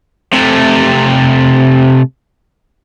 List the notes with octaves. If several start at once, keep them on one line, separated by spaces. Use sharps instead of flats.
C3 A3